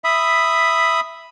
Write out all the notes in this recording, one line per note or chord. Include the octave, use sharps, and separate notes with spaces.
E5 B5 D#6